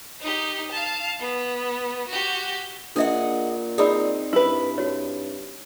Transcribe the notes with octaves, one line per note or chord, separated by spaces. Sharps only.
D#4 G4
F5 A5
B3
F#4 G4
A#2 D4 G#4 D#5 E5 F#5
C4 D#4 G#4 D5 B5
G2 E4 B4
F#4 C#5